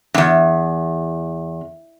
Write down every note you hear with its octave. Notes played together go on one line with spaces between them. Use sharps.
E2 G2